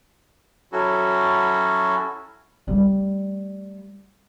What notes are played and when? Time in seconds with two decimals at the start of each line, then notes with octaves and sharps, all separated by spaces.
0.72 F#3 C#4 E4 F#4 A4
2.68 G3 A3